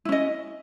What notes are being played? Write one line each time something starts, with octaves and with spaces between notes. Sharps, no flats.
C#4 E4 D#5